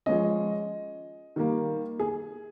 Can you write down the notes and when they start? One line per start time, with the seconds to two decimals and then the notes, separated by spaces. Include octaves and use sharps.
0.06 F3 G#3 C#4 D#5
1.36 D#3 G3 A#3
1.99 G#4